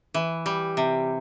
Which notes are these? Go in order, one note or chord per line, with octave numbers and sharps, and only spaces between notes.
E3
G3
C3